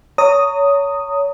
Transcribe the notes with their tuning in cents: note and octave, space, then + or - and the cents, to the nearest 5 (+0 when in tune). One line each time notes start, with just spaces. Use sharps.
C#5 +25 A#5 -30 D#6 +0